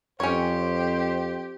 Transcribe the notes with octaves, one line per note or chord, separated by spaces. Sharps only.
F2 C#4 G4 C5 C#5